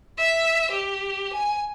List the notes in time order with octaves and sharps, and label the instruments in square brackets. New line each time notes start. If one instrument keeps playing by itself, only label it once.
[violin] E5
G4
G#5